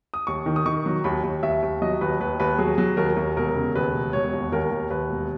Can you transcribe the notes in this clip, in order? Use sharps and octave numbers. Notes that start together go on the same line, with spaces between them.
D#6
D#2 C#6
D#3
D#6
D#3 C#6
F#3
D#2 B5
D#2
D#2 E5
D#2
F#3 D#5
D#2 B4
D#2 B4
D#2 B4
F#3 G#4
F#3
D#2 A#4
D#2
E1 A#4
C#3
D#2 B4
E1
E1 C#5
D#2
D#2 A#4
D#2
D#2 B4
E1